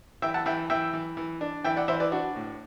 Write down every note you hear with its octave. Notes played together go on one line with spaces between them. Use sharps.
E3 E5 G5
F#5 A5
E3 E5 G5
E3 E5 G5
E3
E3
D4
E3 E5 G5
D5 F#5
E3 C5 E5
B4 D5
D4 F#4
A2